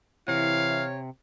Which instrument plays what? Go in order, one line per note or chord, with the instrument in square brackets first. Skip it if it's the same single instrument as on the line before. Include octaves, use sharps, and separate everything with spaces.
[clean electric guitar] C3 [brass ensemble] E3 E4 [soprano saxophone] C#5 [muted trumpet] F5